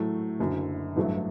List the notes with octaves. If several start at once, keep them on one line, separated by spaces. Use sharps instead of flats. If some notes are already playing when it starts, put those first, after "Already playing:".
Already playing: A2 F#3 A3
F#1 F#2 D3
A1 G2 F#3 A3 E4